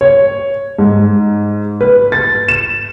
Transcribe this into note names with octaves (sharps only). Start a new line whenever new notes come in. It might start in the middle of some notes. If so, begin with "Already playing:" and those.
C#5
G#2
B4
A6
E7